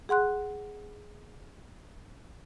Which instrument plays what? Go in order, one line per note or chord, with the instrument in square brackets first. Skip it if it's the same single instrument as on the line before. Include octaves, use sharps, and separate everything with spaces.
[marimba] G#4 F#5 C6 F#6